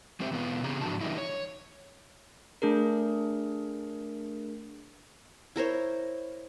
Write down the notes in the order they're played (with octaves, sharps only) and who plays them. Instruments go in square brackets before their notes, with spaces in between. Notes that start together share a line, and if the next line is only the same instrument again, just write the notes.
[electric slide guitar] G#3 C4 G4 C5 E5
E2 B2 B3 F4
C#3 C4 G4 G#4 A#5
G#2 F3 F#3 D4 F#4 A5
D3 E3 G3 A#3 D#4 E4
C#5
[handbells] A3 D4 G#4 A#4
[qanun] E4 A#4 C5 C#5